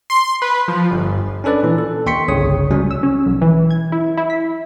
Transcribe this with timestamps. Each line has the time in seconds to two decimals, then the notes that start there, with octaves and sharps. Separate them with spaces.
0.10 C6
0.42 B4
0.68 F3
0.91 G1
1.44 C#4 D4 A4 B4 D5
1.63 A#2 E3
1.78 A4
2.06 D#2 G5 C6 C#6 B6 C#7
2.28 G1 C2 C#3 C#5 D#6
2.71 C#2 F#3 G3 C#4
2.91 E6
3.03 C#4
3.26 B1
3.41 E3
3.71 G#6
3.92 E4
4.17 E4
4.30 B6